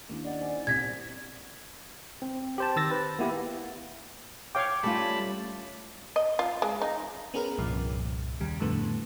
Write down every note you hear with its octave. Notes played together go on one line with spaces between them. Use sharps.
D#2 C#4 D4 E4
D5 D#5 F#5
D#4 C5 G#5
C2 C3 G#6 B6
C4
G4 C5 A5
D#3 E6 A6 A#6
B4
A#3 B3 E4 G4
C#5 F5 G5 D6
G3 A3 C#4 F4 A5 B5
D#5
F4
G#3
D#4
B3 C#4 G#4 A#4 B4
C2 G2 A#2 F3
D#2 C#3 G3
F2 A2 D3 A3 B3